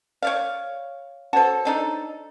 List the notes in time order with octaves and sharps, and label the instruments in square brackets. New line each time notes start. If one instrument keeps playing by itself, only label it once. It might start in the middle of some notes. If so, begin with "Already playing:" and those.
[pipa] C#5 D5 F5
[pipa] F#4 A4 [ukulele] C5 C#5 A5
[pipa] D4 D#4 A4